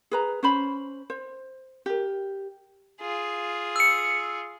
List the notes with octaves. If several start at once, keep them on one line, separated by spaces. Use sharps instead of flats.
G#4 B4 A#5
C#4 C5 B5
C5
G4 A#4
F4 G#4
E6 C#7